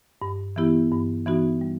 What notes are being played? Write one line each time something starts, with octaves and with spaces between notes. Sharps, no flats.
G2
E3 B3 E4 G4
G2
E3 B3 D#4 F#4
G3